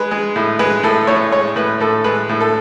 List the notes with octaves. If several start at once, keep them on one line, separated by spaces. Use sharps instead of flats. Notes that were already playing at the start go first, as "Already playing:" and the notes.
Already playing: G#3 B4
G#3
A2
G#3 B4
A2 A4
A2 C#5
G#3 C#5
A2 B4
A2 A4
G#3 B4
A2
A4